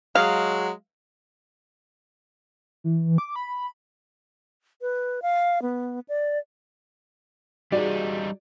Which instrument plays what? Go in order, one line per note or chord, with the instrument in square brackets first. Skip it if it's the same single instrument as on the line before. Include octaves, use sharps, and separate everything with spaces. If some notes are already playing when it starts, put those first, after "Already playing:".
[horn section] F#3 G#3 [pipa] F5
[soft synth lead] E3
D6
B5
[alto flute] B4
F5
B3
D5
[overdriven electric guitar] G3 D#4 [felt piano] F#4 G#4 [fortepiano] D5